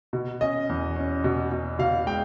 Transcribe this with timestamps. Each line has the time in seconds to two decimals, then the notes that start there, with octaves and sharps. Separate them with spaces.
0.13 B2
0.41 C#4 D#5
0.69 E2
0.96 C#4
1.24 B2
1.52 B2
1.79 B2 F5
2.07 G#3 G5